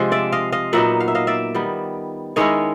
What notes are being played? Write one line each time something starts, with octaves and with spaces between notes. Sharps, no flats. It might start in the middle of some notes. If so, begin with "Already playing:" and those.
Already playing: C3 F3 G#3 D4 C5
D5 E5
D#5 F5
D#5 F5
A#2 F#3 B3 D#4 E5 F#5
F5
E5
D#5 F5
D5 E5
D#3 G3 B3
D#3 G#3 C#4 E4 C#5 D#5